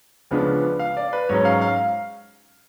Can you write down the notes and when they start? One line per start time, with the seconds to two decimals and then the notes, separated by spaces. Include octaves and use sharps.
0.31 C#2 C#3 F3 B3 D4
0.79 F5
0.97 D5
1.13 B4
1.29 G#2 F#3 C#4 C#5
1.45 F5
1.61 F5